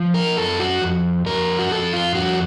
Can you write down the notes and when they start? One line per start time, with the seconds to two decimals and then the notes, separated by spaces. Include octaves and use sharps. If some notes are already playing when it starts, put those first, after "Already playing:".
Already playing: F3
0.14 A#4
0.37 F#2 A4
0.59 F#4
0.81 F2
1.26 F2 A#4
1.59 F#4
1.71 F2 A4
1.93 F4
2.15 F2 F#4